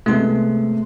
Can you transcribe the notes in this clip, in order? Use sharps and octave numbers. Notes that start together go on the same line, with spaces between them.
C3 G#3 A3 B3 C6